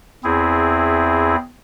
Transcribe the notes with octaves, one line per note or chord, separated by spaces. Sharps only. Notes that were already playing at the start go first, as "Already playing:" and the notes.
E2 C4 E4 G#4